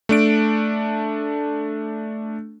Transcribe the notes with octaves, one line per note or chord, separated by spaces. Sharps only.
A3 D4 D7